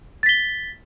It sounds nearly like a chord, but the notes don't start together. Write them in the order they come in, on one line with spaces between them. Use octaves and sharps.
A6 B6 G7